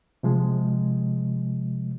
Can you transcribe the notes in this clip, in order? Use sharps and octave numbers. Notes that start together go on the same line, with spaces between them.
C3 F3 G#3